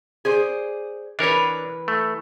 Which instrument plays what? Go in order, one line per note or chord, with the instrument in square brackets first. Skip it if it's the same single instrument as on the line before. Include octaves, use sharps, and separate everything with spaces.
[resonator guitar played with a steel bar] G#4 C5 D5
[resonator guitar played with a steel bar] E3 B4 [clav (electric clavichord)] D4 A#4 C#5
[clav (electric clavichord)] A3